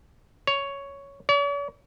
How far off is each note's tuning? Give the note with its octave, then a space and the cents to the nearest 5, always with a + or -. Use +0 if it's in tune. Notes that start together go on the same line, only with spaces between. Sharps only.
C#5 +5
C#5 +45